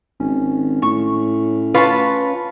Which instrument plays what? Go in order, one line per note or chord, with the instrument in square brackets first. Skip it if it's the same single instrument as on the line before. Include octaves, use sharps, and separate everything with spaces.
[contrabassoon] G#1 [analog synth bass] C#4
[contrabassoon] A2 [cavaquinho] C#6
[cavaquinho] F4 C#5 A5 [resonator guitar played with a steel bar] B4